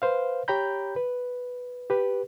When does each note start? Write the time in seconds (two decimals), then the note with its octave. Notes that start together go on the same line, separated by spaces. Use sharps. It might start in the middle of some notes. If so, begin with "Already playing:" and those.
0.02 B4 C5 F5
0.48 G4 C#5 G5 A#5 B5 G6
0.96 B4
1.90 G4 B4